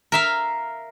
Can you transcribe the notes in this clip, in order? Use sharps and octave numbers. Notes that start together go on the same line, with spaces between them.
A#4 E5 F5